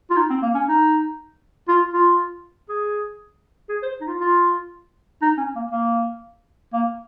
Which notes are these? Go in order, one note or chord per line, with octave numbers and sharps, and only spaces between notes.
F4
D#4
C4
A#3
C#4
D#4
F4
F4
G#4
G#4
C5
D#4
F4
F4
D#4
C#4
A#3
A#3
A#3